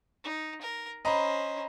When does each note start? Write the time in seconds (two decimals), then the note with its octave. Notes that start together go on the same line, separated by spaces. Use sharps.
0.24 D#4
0.61 A#4
1.05 C#4 C5 D#5 A#5 B5